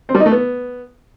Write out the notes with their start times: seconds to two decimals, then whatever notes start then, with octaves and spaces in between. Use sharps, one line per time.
0.09 C4
0.15 G3
0.20 D#4
0.26 A3
0.31 B3